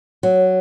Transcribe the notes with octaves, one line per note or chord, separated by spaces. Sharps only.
F#3